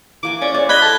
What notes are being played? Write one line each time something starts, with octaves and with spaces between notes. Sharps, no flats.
E3 A#3 G#5 D6
C#4 D5
C5 D5
D#5 B5 F#6 G#6 G7
A4 A5